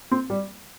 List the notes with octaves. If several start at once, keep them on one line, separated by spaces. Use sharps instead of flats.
C4
G3